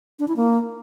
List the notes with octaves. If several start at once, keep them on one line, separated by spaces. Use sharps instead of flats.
D4
E4
A#3